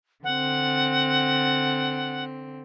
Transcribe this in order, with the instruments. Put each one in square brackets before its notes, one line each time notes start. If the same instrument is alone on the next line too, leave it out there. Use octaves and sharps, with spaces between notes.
[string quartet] D3 C4 [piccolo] F#5